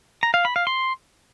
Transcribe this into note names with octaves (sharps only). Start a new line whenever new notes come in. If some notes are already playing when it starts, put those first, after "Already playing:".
A#5
F5
B5
F5
C6